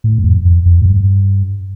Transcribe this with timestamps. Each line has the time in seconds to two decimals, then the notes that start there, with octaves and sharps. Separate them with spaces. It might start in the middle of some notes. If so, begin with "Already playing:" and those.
0.04 A2
0.18 F#2
0.24 F2
0.45 F2
0.66 F2
0.81 G#2
0.86 G2